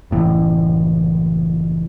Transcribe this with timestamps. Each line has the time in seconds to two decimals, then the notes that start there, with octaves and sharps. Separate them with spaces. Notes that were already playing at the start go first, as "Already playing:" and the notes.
0.11 F#1 A2 E3